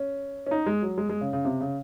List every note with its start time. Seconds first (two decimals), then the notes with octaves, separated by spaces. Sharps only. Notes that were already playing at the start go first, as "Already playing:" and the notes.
Already playing: C#4
0.46 C#4
0.51 D#4
0.66 G#3
0.82 F#3
0.98 G#3
1.09 G#3
1.21 C#3
1.33 C#3
1.45 C3
1.61 C#3